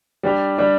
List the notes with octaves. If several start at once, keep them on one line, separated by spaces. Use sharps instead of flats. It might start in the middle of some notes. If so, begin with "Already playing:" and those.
G3 D4 G4
G3 D4 G4